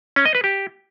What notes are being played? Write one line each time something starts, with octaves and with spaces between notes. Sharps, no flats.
C#4
D#5
B4
G4